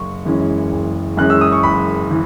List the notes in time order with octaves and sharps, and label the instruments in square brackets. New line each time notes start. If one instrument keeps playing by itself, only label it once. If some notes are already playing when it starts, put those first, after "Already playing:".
Already playing: [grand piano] F#1 C#6
F#2 E3 G#3 C#4
F#1
F#2 E3 G#3 C#4 F#6
E6
D#6
C#6
F#1 B5
E3